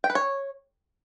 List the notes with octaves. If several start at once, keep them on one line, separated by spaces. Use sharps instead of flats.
G5
B4
C#5